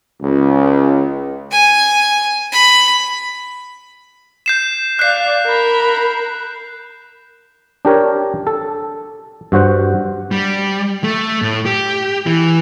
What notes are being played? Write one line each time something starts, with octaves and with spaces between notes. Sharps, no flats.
C#2
G#5
B5
G6 C7 E7
D5 F5 F#6 C7
A#4 B5
D4 G4 A#4 C#5
A4
G2 F#4 C5 F#5
G3
A3
A2
G4
E3